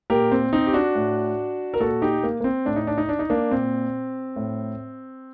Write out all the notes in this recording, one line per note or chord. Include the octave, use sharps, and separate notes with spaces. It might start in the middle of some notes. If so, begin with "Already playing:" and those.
A#2 G4 A#4
C4
C4 D#4
G4
D4 F#4
A2
A#4
A#2 F#4 A4
D#4 G4
A#3
A#3
C4
A2 D4
D#4
D4
D#4
D4
D#4
A#3 D4
A#2 C4
A2